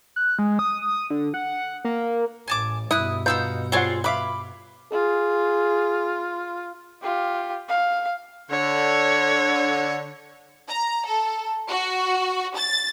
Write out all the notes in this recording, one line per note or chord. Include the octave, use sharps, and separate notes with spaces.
F#6
G#3
D#6
D3
F#5
A#3
A1 G#5 A5 D6
G2 B2 E4 D#6 F#6
B3 D#4 F4 F#5 E6 G6
G3 C4 F4 G#4 C#5 F#5
B4 E5 F5 B5 D6
F4 G#4
F4 G4
F5
D3 C#5
A#5
A4
F#4
A6